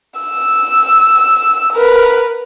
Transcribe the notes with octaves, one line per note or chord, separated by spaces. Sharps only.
E6
A#4 B4